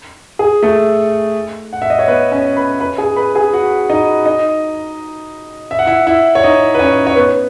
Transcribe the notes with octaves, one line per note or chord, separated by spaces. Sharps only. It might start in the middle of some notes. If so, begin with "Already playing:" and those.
G#4
A3 A4
F#5
E5
D#5
C#5
B3 B4
C#4 C#5
B4 B5
B4 B5
G#4 G#5
B4 B5
G#4 G#5
F#4 F#5
D#4 D#5
D#4 D#5
E5
F#5
E4 E5
E4 E5
C#5
D#4 D#5
B4
C#4 C#5
C#5
B3 B4